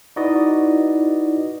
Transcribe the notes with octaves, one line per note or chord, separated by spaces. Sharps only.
D#4 E4 F#4 B4 D5 D#5